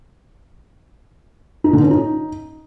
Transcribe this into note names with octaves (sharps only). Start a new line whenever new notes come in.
D#4
D3
C#4
D#4